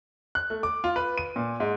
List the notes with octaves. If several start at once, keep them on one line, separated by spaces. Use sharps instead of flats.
F#6
A3
D6
F4
B4
D#7
A#2
G#2